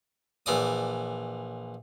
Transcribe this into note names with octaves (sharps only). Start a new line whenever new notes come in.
A#1 E3 D5 D#6